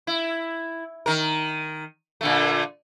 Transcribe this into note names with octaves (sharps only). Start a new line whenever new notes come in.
E4
D#3 A#4
A#2 D3 A3